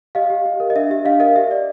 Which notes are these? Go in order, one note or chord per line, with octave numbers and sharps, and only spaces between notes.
G4 D#5 F5
G4
G4
A#4
D#5
D4 E5
G4 E5
D4 D#5 F5
A#4 D#5 F5
G4 E5
D5